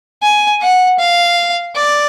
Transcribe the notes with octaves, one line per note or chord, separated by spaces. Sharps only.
G#5
F#5
F5
D5